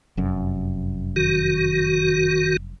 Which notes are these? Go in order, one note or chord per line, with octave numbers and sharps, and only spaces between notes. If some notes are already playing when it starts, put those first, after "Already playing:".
F1 F#2
D#3 F#4